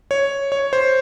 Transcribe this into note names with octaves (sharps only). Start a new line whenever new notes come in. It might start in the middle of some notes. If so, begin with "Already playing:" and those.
C#5
C#5
C5